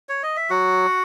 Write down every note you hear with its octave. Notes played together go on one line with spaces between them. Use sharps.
C#5
D#5
E5
F#3 F#4 F#5